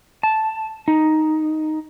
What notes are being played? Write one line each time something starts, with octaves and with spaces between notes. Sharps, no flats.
A5
D#4